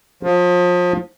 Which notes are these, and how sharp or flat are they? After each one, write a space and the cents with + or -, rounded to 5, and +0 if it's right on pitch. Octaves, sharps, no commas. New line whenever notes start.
F3 +30